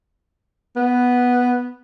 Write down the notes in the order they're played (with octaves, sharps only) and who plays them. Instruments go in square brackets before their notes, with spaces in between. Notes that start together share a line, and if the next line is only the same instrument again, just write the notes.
[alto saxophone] B3